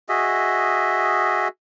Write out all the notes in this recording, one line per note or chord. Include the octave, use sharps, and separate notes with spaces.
F#4 G#4 D#5 E5